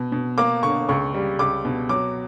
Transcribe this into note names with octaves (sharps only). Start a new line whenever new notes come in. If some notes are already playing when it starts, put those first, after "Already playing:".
Already playing: B2
B2
A#3 D6
D3 C#6
C#2 C#6
G3
C#2 D6
B2
F#3 D6